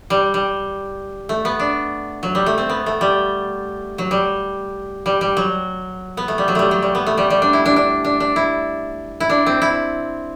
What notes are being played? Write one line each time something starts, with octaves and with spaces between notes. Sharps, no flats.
G3
G3
A3
B3
D4
F#3
G3
A3
C4
B3
A3
G3
F#3
G3
G3
G3
F#3
B3
A3
G3
F#3
G3 A3
F#3
G3
B3
A3
G3
G3
D4
E4
D4
D4
D4
D4
E4
E4
D4
C4
E4